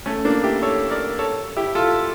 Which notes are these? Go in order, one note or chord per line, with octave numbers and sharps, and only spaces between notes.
A3 C#4
A#3 D4
E4 G4
A4 C#5
A#4 D5
A4 C#5
E4 G4
F4 A4